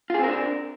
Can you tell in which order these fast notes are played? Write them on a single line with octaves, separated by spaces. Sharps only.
F4 G#4 C4 A#4 D4